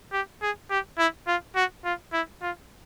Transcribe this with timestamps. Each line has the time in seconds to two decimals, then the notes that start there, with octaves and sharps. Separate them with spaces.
0.12 G4
0.42 G#4
0.70 G4
0.98 E4
1.27 F4
1.56 F#4
1.85 F4
2.13 E4
2.42 F4